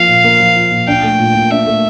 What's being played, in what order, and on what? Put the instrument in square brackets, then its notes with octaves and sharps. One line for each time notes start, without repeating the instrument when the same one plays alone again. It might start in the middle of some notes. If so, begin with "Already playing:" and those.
Already playing: [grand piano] F3 A#3 F4 [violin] F5
[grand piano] A#2
A#3
F3
F4
A#2
[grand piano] D4 [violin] G5
[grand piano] A3
A#2
A#2
[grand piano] D4 [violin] E5
[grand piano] A3